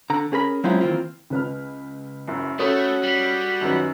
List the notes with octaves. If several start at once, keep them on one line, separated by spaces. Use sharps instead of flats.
D3 A#5
C#4 G#4 A#4 B5
F#3 G#3 C4 C#4 E4 F4
D#3 E3 A3 A#3 C4 F4
C#2 B4 F6
F#1 F#2
A3 C#4 F#4 A4 B5 D#6
G3
F#2 D#3 F#3 B4